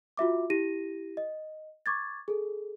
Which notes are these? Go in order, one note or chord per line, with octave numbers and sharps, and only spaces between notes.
F4 F#4 E5 D6
E4 G4 A#6 D#7
D#5
C#6 D6 G#6 A6
G#4 A4